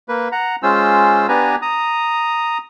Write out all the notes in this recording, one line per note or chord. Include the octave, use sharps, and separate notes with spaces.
A#3 B4
F#5 A#5
G#3 C#4 F4 C5 E6
B3 D4 G4 B4 G#5 A#5
A#5 D#6